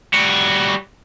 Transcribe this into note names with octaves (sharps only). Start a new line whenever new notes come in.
G3 F#4